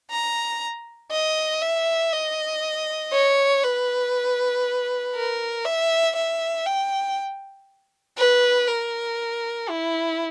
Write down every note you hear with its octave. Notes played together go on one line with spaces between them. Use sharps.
A#5
D#5
E5
D#5
C#5
B4
A#4
E5
E5
G5
B4
A#4
E4